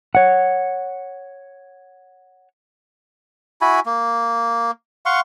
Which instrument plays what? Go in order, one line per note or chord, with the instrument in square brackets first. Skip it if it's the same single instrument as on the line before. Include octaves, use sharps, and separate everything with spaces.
[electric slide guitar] C#5 F#5
[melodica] E4 F#4 G#5 B5
A#3
F5 F#5 C6 C#6